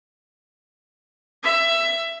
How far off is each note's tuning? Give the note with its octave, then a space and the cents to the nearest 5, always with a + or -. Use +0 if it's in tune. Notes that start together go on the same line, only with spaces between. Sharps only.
E5 +15